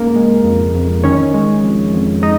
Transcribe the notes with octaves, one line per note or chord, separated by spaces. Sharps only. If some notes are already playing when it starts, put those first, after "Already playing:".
Already playing: G#2 C#3 A#3 A#4
G#3
F2
F2
D#3 C#4 C#5
G#3
F2
F2
G#3 D#4 D#5